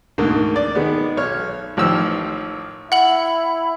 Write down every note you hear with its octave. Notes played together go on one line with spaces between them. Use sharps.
D2 G#2 D3 A#3
D5
D#3 G#3 B3
B1 C#5 F6
A1 D#3 F3 G5 E6
E4 F#5 F#7